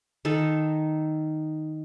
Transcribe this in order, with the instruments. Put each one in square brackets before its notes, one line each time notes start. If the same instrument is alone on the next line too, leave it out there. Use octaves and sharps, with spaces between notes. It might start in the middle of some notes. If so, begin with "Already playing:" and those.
[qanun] D#3 D#4 A4